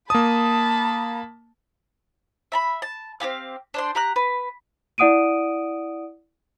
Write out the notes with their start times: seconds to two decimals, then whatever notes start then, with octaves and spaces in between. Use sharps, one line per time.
0.10 A#3 A5 B5 D#6
2.52 E5 A#5 B5
2.82 A5
3.20 C4 E4 G4 F5
3.74 D4 C5 C6
3.95 G4 A#5 F#6
4.16 B4
4.98 E4 D5 F#5 D#6 D7 D#7